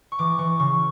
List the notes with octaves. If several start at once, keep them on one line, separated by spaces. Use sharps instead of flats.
C#6
E3 D6
E3 C#6
C#3 C#6